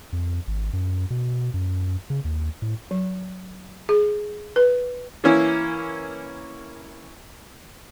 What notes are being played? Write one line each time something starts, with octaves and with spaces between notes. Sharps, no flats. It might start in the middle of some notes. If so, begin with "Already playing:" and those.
F2
G#1
F#2
B2
F#2
C#3
D#2
A2
F#3
G#4
B4
E3 A#3 C#4 E4